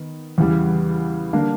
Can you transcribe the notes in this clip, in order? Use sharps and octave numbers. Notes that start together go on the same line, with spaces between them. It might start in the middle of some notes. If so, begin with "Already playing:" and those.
Already playing: D#3 B3
E2 C#3 E3 G3
D3 G3 A#3 D4